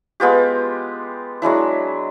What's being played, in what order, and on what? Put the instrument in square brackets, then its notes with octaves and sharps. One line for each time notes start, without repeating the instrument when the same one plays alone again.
[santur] G#3 B3 F4 G4
F#3 G#3 D4 E4